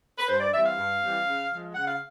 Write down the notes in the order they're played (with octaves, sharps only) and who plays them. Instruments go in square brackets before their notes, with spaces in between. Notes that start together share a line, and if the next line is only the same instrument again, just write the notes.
[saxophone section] B4
G2 C5
D5
E3 G3 C4 E5
F5
G2
E3 G3 C4
C#3
F3 G#3
C#3 F#5
F5